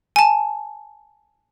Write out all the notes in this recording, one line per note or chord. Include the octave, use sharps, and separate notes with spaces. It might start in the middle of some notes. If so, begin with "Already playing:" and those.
G#5 A5